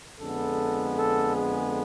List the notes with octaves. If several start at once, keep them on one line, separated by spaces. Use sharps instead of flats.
F2 D3 G#3 B3 A4
A4
G#4